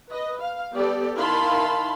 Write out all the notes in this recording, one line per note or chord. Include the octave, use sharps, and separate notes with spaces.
B4 D#5
F5
G3 B3 G4 A4 D5
D#3 E4 F5 A5 B5 C6